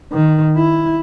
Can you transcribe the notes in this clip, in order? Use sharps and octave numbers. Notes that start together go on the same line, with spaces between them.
D#3
E4